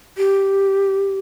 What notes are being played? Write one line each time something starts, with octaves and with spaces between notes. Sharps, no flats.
G4